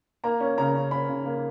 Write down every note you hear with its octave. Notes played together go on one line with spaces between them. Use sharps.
A#3 A#5
C#4
C#3 A#5
C#4
C#4 B5
C#3
A#3